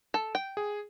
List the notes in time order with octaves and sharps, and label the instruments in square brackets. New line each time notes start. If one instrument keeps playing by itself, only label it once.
[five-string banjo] A4
G5
[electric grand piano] G#4